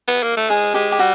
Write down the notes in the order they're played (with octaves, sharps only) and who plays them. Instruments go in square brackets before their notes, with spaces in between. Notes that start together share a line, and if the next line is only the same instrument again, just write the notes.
[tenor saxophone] B3
A#3
A3
[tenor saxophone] G#3 [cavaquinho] G#4
[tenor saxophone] G#3 [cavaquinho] G4
[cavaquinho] G4
[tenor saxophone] G3 [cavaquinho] F#4